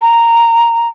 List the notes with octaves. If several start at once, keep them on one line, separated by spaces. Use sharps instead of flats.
A#5